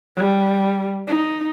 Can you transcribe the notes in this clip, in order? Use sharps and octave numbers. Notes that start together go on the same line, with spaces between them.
G3
D#4